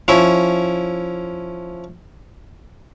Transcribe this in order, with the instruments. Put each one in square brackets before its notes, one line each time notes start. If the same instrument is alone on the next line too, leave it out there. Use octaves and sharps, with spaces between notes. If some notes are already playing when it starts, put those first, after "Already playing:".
[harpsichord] F3 C#4 E4